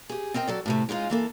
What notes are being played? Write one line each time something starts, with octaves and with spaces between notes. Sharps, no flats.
G4 G#4
C4 A#4 D#5 G5
F#3 A4 D5
A2 C3 A3
G#3 C#4 D#4 F4
E3 A#3 A4